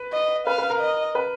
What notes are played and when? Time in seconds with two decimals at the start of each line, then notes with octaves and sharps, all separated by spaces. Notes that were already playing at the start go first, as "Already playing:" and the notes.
Already playing: B4
0.12 D#5
0.47 B4 F5
0.58 B4
0.70 A#4
0.81 D#5
1.15 B4